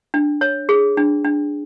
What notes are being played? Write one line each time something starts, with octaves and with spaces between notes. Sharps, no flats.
D4
C#5
G#4
D4
D4